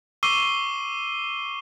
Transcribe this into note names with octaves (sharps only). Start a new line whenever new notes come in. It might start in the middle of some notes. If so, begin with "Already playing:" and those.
C#6 D6 E6 C7 D#7 G7